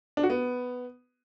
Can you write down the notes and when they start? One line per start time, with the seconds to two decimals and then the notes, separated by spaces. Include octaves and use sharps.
0.17 D4
0.23 F#4
0.30 B3